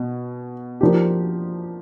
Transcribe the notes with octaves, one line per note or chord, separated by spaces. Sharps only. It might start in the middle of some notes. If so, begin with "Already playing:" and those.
Already playing: B2
F3 A#3 D4 G4